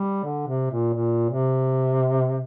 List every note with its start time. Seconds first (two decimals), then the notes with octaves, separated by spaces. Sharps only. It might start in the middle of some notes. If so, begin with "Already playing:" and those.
Already playing: G3
0.24 D3
0.47 C3
0.70 A#2
0.94 A#2
1.30 C3